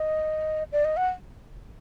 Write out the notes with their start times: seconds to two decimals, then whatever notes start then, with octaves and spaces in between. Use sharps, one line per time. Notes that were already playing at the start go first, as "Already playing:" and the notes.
Already playing: D#5
0.72 D5
0.85 D#5
0.97 F#5